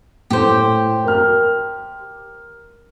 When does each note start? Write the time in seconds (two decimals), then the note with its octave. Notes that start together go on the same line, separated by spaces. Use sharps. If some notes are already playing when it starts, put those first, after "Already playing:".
0.30 A2 G4 C5
1.04 A#4 F6